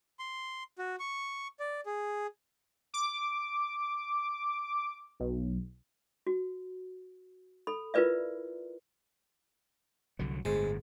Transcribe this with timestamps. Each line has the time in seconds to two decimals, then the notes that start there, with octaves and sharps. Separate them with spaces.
0.19 C6
0.79 F#4
1.00 C#6
1.60 D5
1.86 G#4
2.94 D6
5.20 B1
6.27 F#4
7.67 A4 B5
7.94 E4 F4 A#4 B4 D5 E5
10.19 C2 D3 F#3
10.45 G1 A2 G#3 C5